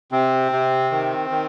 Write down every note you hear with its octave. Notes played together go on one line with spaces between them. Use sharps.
C3 C4
C3
D#3
D#3